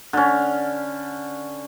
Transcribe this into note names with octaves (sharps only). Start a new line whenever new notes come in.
D3 C#4